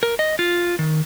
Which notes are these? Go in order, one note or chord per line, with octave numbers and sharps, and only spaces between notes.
A#4
D#5
F4
D#3